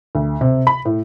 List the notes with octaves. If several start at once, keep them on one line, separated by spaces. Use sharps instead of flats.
D2
C3
B5
A2